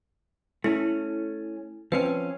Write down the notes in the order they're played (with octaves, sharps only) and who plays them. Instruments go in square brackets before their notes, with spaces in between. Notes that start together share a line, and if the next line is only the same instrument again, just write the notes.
[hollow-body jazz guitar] A3 C#4 [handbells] E4
[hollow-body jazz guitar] F3 C4 C#4 [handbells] B4